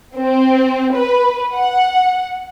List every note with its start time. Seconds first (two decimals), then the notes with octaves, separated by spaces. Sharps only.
0.15 C4
0.94 B4
1.53 F#5